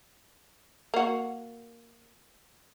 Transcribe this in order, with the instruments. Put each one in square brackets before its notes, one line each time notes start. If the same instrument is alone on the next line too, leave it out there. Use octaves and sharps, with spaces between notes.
[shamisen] A#3 F#4